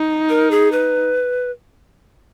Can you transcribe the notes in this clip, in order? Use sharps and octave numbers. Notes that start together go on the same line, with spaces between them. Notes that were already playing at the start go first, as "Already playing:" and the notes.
Already playing: D#4
A#4
G#4
B4